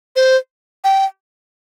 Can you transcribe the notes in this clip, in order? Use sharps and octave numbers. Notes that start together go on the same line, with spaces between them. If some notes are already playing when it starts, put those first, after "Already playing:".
C5
G5